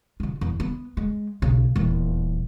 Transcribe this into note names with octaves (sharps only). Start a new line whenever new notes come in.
C#3 F4
E2
B3
G#3
B1 C#3
D#1 E2